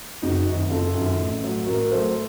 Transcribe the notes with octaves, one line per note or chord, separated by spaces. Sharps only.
F#1 D#4 F#4
F#2 D#3
F#1 F4 A4
F#2 D#3
A1
A2 F#3
A1 F#4 A#4
A2 F#3 A4 C5